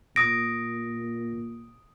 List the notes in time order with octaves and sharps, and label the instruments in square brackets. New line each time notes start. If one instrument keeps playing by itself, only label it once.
[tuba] A#2 [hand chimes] D#6 D7 [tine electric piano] A#6